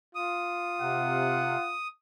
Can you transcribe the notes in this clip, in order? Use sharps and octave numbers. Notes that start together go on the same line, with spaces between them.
F4 D#6
C3 F#5